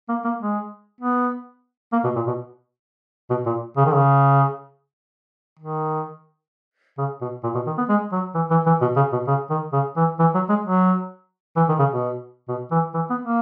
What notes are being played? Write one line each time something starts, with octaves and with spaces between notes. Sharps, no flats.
A#3
A#3
G#3
B3
A#3
B2
A#2
B2
B2
A#2
C#3
D#3
C#3
D#3
C#3
B2
A#2
B2
D#3
B3
G#3
F#3
E3
E3
E3
B2
C#3
B2
C#3
D#3
C#3
E3
E3
F#3
G#3
F#3
E3
D#3
C#3
B2
B2
E3
E3
B3
A#3